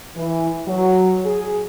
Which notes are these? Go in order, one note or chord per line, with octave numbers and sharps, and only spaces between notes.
E3
F#3
G#4